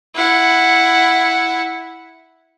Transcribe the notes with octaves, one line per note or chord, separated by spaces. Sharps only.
E4 F#5